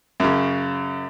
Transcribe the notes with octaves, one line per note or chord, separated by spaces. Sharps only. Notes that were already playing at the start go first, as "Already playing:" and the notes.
F#2 C#3